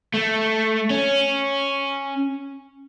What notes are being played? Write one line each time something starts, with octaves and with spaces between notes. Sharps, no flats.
A3
C#4